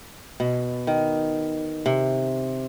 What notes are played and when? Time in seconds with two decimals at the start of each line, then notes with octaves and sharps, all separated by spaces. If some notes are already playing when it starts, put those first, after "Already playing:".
0.40 B2
0.87 D#3
1.86 C3